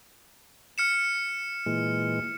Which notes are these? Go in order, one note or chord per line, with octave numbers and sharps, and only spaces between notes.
F6 C#7 E7
A#2 E3 G#3